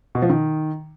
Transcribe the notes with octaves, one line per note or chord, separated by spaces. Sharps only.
B2
F3
D#3